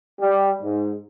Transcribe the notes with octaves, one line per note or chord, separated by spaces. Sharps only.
G3
G#2